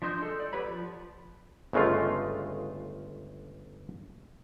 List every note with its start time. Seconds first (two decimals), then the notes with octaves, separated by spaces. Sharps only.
0.02 F3 D4 C5 D#5 G6
0.21 G#3 A4
0.40 D5
0.53 B3 G4 B4 C#5 B5
0.64 F3
1.73 G1 C#3 G#3 A3 F4